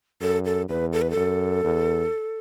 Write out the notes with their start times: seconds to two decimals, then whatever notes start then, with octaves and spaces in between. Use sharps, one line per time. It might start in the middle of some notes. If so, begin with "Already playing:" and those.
0.21 F#2 A4
0.45 A4
0.69 E2 B4
0.93 A4
1.02 B4
1.11 A4
1.16 F#2
1.64 E2